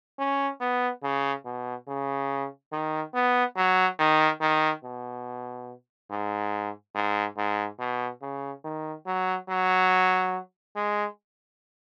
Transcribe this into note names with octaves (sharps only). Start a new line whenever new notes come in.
C#4
B3
C#3
B2
C#3
D#3
B3
F#3
D#3
D#3
B2
G#2
G#2
G#2
B2
C#3
D#3
F#3
F#3
G#3